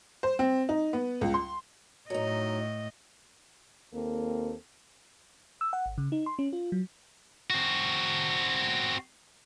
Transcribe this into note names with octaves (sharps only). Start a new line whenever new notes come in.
C5
C4
D#4
B3
C#2
C6
A2 F#3 D#4 D#5
D#2 A#3 C4 A4
E6
F#5
G#1
C#3
D#4
C6
C#4
F4
F#3
C4 F#4